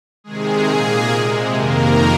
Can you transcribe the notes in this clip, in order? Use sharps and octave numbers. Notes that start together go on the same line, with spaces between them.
C3 D#3 G#3 G#4
A#2 A#3 G#4
C3 G#3
F2 C3 D#3 A#3 A#4